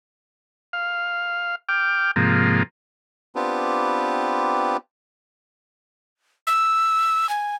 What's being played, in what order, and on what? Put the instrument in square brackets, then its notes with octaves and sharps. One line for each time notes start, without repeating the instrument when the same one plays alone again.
[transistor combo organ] F5
G5 D6 F6
G#2 C3 F3 A#3
[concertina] B3 C4 D4 F4 G4 B4
[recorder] E6
G#5